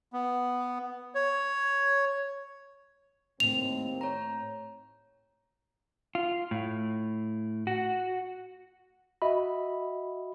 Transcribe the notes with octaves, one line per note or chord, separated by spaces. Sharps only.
B3
C#5
D#2 A2 A3 C4 F7
C#5 A#5
F4
A2
F#4
F#4 D#5 E5 B5